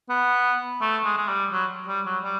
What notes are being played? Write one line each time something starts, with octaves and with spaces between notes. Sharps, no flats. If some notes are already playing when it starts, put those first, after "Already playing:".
B3
A3
G#3
G#3
G3
F#3
G3
F#3
G3